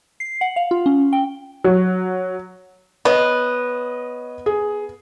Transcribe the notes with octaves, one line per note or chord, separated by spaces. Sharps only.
C7
F#5
F5
F4
C#4
G5
F#3
B3 C#5 D#5
G#4